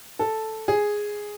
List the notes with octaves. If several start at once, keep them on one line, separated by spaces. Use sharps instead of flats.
A4
G#4